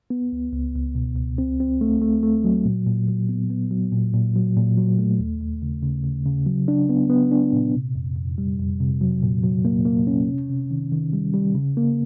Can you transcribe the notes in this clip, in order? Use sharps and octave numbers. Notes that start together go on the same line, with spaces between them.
B3
C#2
C#2
C#2
B2
C#2
C4
C4
A3
A3
A3
F#3
A#2
A#2
F#3
B3
B3
F#3
A#2
A#2
F#3
A#2
F#3
A3
D#2
D#2
C#3
C#3
C#3
C#3
F#3
D4
B3
B3
D4
A#2
C3
F2
F2
G3
F2
C3
F#3
A#2
F#3
A#3
A#3
C#4
C3
C3
D#3
D#3
G3
G3
C#3
A#3